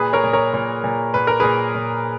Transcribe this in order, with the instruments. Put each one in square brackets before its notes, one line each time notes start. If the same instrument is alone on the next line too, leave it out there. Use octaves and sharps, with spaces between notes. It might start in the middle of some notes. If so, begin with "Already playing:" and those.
Already playing: [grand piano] A#2 G#4 B4
A#4 C#5
A#2
A#4 C#5
A#2
A#2
A#2 B4
A#4
A#2 G#4 B4
A#2